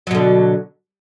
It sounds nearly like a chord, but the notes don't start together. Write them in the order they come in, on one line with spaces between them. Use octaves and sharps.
F#3 B2 D3